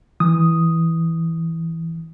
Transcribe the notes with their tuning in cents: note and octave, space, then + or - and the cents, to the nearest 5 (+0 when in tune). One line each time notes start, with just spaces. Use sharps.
E3 -5 D#6 +0